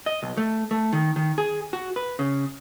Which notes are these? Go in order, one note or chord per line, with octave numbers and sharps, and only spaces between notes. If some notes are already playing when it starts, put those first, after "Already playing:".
D#5
B1
A3
A3
D#3
D#3
G#4
F#4
B4
C#3